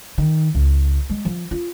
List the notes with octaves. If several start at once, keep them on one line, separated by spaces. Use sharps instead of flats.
D#3
C#2
G#3
F3
F4